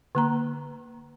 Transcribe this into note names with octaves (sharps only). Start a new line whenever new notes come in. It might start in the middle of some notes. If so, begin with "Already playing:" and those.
D3 A#3 A#5